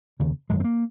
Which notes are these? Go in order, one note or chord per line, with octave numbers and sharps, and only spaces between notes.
F1 D#2 C#3
G#1 F#2 C#3 G#3
C4
A#3